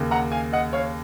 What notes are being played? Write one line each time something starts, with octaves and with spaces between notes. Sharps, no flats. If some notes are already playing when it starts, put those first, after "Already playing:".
Already playing: D#2 C#3
F#5 A#5
F5 G#5
D#5 F#5
C#5 F5